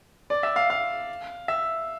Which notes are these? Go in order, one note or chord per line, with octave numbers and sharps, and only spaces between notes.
D5
E5
F5
F5
E5